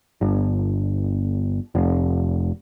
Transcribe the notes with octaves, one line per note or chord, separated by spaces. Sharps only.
G1
F1